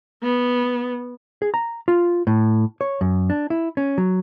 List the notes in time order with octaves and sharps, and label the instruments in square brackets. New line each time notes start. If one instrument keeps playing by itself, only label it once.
[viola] B3
[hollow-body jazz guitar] G#4
A#5
F4
A2
C#5
F#2
D4
E4
C#4
F#3